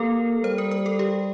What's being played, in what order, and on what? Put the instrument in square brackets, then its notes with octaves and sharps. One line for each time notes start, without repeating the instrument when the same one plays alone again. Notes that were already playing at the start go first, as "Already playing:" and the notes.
Already playing: [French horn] A#3 [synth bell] G4 A4 A#4
[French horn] G3 [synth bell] C5
[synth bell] A#4
A#4
A4
G4